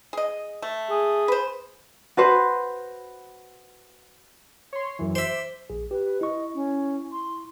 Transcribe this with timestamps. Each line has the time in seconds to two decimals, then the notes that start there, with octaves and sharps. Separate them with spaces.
0.13 G#4 D#5
0.62 A3
0.90 G#4
1.28 B4 C5
2.17 F#4 B4 C5
4.73 C#5 C6
4.99 F#2 E3
5.15 C5 E5 D6
5.70 A#1 G#4
5.91 G4 B4
6.21 E4 D#5 C#6
6.54 C#4
7.12 C6